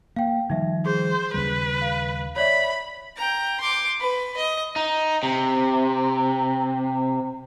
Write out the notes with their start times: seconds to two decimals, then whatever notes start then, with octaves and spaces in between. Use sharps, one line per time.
0.16 A#3 F5 G5
0.50 D#3 F3 G3 D#4 E5
0.86 G#4 C5
1.34 D#2 C#3 G3 B4
1.81 F5
2.36 C#5 D5 E5 B5
3.17 G5 A#5
3.61 C6 D6
4.00 B4 B5
4.37 D#5
4.76 D#4
5.23 C3